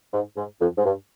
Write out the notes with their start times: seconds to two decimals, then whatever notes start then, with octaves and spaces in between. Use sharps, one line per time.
0.13 G#2
0.37 G#2
0.61 F2
0.77 G#2
0.85 G2